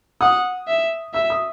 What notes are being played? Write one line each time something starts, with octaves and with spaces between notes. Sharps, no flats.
F#5 D#6
E5
E5 E6
D#6